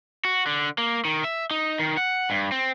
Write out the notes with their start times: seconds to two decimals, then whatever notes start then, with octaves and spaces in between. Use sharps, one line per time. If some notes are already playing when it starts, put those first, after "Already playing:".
0.25 F#4
0.46 D3
0.78 A#3
1.05 D#3
1.24 E5
1.51 D#4
1.79 D#3
1.97 F#5
2.30 G2
2.52 C4